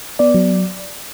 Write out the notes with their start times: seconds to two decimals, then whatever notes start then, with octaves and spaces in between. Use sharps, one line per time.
0.19 B3 D5
0.34 F#3